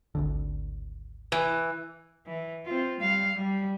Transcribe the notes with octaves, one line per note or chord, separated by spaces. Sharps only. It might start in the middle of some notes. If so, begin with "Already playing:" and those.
G#1 D2 D3
E3
E3
C4 F4
G3 F5
G3